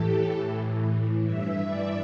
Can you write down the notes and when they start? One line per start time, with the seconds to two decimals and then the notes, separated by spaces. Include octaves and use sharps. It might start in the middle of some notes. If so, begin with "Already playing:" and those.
Already playing: A2 E3 G4 A4
0.37 A2 E3
1.25 G2 E3 E5
1.68 D5